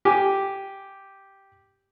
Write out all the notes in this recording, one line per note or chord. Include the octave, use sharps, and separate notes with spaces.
G4 G#5